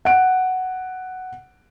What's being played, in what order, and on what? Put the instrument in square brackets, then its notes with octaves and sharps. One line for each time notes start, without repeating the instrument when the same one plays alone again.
[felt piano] F#5 D7